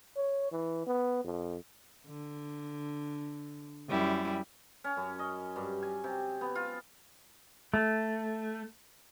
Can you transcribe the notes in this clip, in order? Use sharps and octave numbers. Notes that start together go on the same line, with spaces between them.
C#5
E3
B3
F2
D3
F#2 G3 E4
C#4
F#2
D#5
G2
G#5
C3
B3
F4
A3